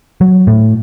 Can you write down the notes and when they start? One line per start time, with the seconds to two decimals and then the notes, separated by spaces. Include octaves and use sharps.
0.21 F#3
0.47 A2